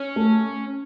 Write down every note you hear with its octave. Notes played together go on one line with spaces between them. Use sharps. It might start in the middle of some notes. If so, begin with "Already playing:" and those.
Already playing: C#4
A3